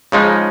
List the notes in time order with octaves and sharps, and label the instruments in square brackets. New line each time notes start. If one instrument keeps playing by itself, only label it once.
[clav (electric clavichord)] C#3 F3 G#3 D#4